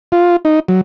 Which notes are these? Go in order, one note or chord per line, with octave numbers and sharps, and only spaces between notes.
F4
D#4
F#3